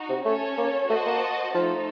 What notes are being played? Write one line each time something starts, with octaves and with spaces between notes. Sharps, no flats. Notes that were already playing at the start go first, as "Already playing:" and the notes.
Already playing: D#4 F#4
C3
A3 C#4 A4 C#5
A#3
A3 F#4 C5 D#5 F#5 A5
A#3
F3 A3 D#4 A4